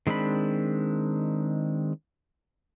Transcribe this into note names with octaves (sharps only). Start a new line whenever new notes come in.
D#3 G#3 C4 D4 B5